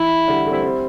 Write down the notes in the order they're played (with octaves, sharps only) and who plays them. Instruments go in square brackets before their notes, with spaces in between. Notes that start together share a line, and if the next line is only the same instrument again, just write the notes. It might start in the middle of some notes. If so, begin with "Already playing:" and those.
Already playing: [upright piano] E3 [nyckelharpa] E4
[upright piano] D3 G3
A3
G3 C4
G3 C4